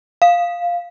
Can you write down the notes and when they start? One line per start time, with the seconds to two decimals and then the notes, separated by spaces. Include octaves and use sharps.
0.22 F5